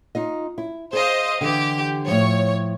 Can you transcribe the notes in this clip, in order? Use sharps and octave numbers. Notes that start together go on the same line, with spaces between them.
D#4 F4 D#5
E4
G#4 C5 D#5 F5
D3 E3 G4
A2 F3 C#5